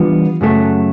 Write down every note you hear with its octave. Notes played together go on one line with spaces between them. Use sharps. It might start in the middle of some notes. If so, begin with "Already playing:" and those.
Already playing: E3 G3 B3 D4 F4
F#2 C#3 F#3 A3